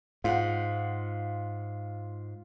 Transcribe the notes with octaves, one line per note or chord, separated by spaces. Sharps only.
G#2 F4 F#5